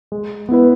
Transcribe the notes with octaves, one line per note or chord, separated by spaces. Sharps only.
G#3
B3 E4 B4